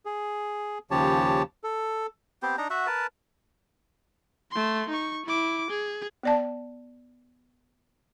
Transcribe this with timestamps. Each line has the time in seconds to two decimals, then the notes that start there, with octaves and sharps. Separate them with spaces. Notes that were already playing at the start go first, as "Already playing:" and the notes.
0.05 G#4
0.91 D#2 C#3 F3 G4 C#5 A5
1.64 A4
2.42 B3 C4 G4 C5
2.58 D4 D#4 A#5
2.70 F#4 E5 F#5
2.87 A#4 B4 A5
4.52 A3 C6
4.89 D#4 C#6
5.25 E4 D6
5.70 G#4
6.23 B3 D5 A5